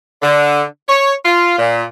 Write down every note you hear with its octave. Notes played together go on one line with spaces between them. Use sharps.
D3
C#5
F4
A#2